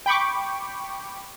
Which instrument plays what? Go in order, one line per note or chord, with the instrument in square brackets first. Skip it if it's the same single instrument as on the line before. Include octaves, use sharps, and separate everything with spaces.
[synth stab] G5 B5 C#6 D6